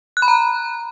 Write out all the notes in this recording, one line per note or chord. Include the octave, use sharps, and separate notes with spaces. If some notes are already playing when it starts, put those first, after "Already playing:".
F#6
B5
A#5